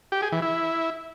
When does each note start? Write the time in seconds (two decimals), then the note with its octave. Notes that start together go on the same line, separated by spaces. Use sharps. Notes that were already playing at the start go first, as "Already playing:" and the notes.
0.12 G4
0.22 G#4
0.32 E3
0.42 E4